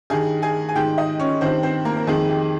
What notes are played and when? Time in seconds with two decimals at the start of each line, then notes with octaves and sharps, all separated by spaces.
0.10 G2 D#3 G#4 G#5
0.42 G#4 G#5
0.69 G#5
0.75 G#2 D#3 G4 G5
0.98 D#4 D#5
1.19 C#4 C#5
1.41 G2 D#3 C4 C5
1.63 C4 C5
1.85 A#3 A#4
1.97 A#4
2.07 F2 D#3 G#3 G#4
2.29 G4